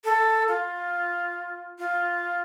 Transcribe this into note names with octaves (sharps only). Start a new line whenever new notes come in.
A4
F4
F4